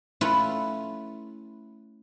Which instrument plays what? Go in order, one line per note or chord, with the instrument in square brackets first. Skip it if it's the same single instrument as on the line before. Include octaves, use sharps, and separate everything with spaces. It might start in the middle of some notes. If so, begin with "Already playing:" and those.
[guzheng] A3 C#4 E4 F4 B4